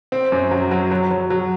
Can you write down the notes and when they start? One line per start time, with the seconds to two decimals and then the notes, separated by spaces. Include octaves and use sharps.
0.12 C4
0.32 F#2
0.51 F#3
0.71 F#3
0.91 F#3
1.11 F#3
1.30 F#3